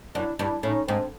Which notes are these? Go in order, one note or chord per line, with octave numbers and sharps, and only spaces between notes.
F#2 D4 E4
G2 D4 E4
A2 C#4 D#4
G#2 C4 D4